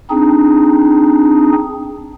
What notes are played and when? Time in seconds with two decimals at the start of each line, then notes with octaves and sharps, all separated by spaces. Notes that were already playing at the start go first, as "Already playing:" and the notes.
0.10 C4 D4 D#4 G#4